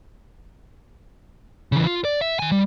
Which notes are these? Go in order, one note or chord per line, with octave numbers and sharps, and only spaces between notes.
C#3 E3
F4
D5
E5
D#3 G#5
G3